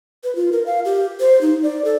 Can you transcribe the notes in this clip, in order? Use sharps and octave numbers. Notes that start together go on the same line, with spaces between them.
B4
F4
A#4
F5
G4
C5
D#4
D5
A4